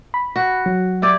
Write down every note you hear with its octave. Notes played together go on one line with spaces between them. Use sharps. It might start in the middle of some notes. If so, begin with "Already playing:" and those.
B5
F#4
F#3
E4 G4 D5